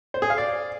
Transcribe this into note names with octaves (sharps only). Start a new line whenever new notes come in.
C5
G#4
F5
D5